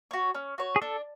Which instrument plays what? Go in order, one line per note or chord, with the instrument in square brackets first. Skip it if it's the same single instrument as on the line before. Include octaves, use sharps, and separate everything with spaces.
[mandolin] F#4 C#5
C#4
F#4 C#5
[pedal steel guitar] G#4
[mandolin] D4 [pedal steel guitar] A4